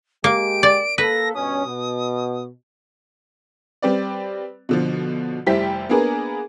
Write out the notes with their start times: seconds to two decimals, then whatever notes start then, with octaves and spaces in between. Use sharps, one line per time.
0.24 G#3 A#3 G4 D7
0.63 D5
0.98 A#3 A4 B4 A#6
1.35 G2 B2 C#4 D#6
1.66 B2
3.82 G3 C4 B4 D5
4.69 B2 D3 F3
5.46 F1 G3 E4 G4 C5 B6
5.89 A#3 B3 D4 G#4 A#4 B4